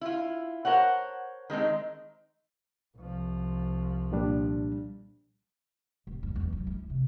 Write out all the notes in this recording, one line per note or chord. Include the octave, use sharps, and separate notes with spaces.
E4 F4
A#4 C5 C#5 F#5
D#3 G#3 C4 D#4
C2 F3
A#2 G3 D4
D1
F2
E2
F#2
E4
C3